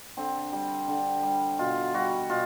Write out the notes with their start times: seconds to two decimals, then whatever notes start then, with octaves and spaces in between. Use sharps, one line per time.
0.17 D3 C4
0.53 G3
0.88 D3
1.23 G3
1.59 B2 F4
1.94 G3 F#4
2.30 B2 F4